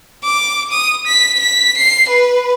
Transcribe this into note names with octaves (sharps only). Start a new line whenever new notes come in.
D6
D#6
B6
B6
C7
B4